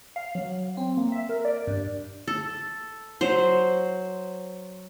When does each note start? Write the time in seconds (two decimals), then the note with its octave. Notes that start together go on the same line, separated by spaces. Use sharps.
0.16 F5
0.35 F#3
0.77 C4
0.97 A#3
1.12 E5
1.29 A#4
1.45 D5
1.67 G2
2.28 A4
3.21 F#3 C5